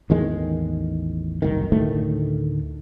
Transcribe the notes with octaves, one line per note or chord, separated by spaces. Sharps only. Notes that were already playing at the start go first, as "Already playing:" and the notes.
A1 E2 D#3 G#3
F#1 C2 D#3
D2 A2 D#3 A3